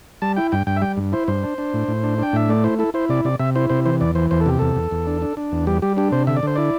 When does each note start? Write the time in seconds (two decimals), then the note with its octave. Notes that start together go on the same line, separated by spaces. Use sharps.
0.22 G3 A5
0.36 E4 G5
0.52 G2 G5
0.67 G2 G5
0.77 E5
0.82 G3 G5
0.97 G2
1.12 E4 C5
1.28 G2 C5
1.43 D4
1.58 D4
1.74 A2
1.88 A2
2.03 D4
2.18 D4 G5
2.33 A2 E5
2.49 A3 D5
2.64 E4 C5
2.79 E4 A4
2.94 E4 C5
3.09 C3 D5
3.25 C3 D5
3.39 C3 E5
3.55 E4 C5
3.70 C3 C5
3.85 E3 C5
4.01 E2 D5
4.15 E3 C5
4.31 E2 C5
4.41 A4
4.46 C3 G4
4.59 E2 A4
4.76 E2
4.91 E2
5.07 D4
5.22 D4
5.37 D4
5.52 E2
5.67 G3 G4
5.82 G3 G4
5.97 D4 G4
6.12 C3 C5
6.27 D3 E5
6.37 D5
6.43 D3 C5
6.56 E4 D5